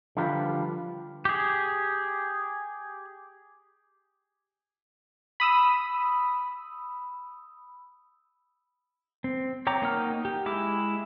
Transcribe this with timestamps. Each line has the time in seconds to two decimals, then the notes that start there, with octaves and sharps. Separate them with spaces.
0.17 D3 F3 G3 F4 B4
1.25 G4 G#4
5.40 B5 D#6 E6
9.24 C4
9.67 C#5 G5 A#5 D6
9.82 A#3 D#4 F#5 G5 F6
10.25 G4
10.46 G#3 E4 D6